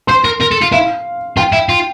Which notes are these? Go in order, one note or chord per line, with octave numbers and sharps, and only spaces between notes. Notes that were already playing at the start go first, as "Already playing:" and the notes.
C5 C6
A#4
A#4
A4
F4
E4 F5
F4 G5
E4
F4